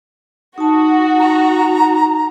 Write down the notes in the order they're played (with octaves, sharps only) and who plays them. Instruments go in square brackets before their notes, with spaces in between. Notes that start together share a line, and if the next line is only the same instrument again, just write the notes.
[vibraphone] D#4 A5 [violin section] F#4
[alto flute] A#5